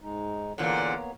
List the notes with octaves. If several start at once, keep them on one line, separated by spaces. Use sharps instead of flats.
G#2 G#3 D#4
E2 A#2 D3 A#3 B3 C#5